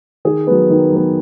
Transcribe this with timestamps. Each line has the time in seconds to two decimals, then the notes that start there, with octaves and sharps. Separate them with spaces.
0.25 D#3 G#4
0.47 F#3 B3
0.70 D#3
0.92 F#3 B3